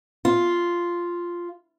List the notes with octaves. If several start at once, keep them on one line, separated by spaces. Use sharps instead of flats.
F4